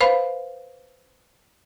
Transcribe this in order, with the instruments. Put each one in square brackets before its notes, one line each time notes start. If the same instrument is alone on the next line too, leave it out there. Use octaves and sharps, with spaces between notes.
[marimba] B4 C5 F5 B5